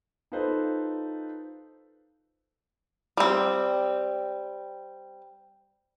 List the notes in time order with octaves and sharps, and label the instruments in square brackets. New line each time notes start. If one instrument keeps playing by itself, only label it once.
[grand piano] D#4 F4 A4 B4 C5
[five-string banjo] G3 C4